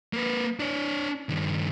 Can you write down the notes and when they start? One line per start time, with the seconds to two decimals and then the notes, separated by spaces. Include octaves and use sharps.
0.13 A#3 B4
0.60 D4 C#5
1.29 G2 D#3